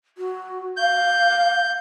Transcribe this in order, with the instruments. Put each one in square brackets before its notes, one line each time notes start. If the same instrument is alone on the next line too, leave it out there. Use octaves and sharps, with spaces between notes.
[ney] F#4
[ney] F5 [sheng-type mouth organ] G6